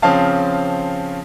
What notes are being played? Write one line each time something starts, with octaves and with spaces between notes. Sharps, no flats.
C#3 F3 C4 C#4 F5 A5